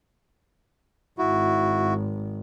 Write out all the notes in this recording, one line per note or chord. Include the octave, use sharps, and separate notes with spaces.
G#1 E4 F#4